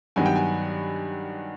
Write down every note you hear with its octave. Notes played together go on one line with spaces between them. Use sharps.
G2 D#3 F#3 B3 G#5
G5
G#5